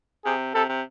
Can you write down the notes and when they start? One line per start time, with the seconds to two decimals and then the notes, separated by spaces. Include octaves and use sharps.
0.25 C3 G#4
0.54 C3 A4
0.69 C3